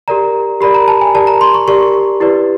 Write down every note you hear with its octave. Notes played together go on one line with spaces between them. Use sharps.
G4 A#4 D5 A#5
G4 A#4 D5 B5
A#5
A5
G#5
G4 A#4 D5 A5
A#5
C6
C#6
G4 A#4 D5 C#6
E4 G4 B4 D5